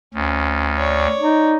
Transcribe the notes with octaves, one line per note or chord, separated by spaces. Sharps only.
D2 C#4
C#5 D5
D#4